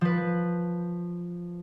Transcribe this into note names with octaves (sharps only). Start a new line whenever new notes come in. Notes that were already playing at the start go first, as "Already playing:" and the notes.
F3 B4